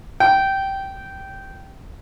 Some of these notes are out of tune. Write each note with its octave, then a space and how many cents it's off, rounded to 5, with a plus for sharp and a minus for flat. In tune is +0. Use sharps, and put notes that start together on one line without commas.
G5 -10